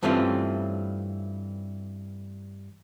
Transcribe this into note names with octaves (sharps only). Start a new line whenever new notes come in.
G2 E3 A3 C4 C#4 F4